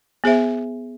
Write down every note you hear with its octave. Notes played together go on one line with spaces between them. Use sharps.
B3 G#4 C5 E5